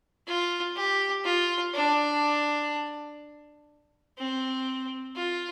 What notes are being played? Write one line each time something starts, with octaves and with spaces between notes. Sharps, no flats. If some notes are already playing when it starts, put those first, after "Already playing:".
F4
G4
F4
D4
C4
F4